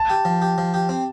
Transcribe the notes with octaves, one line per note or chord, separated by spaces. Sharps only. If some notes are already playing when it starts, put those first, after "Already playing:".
Already playing: A5
G4
F3
G4
F3
G4
C4